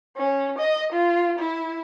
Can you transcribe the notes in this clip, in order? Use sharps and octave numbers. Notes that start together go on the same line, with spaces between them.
C#4
D#5
F4
E4